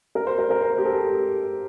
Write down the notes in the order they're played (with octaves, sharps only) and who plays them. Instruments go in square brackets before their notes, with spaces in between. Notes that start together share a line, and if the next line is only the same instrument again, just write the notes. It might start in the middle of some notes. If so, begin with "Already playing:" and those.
[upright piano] A#4
C5
A#4
A#4
C5
G4
A4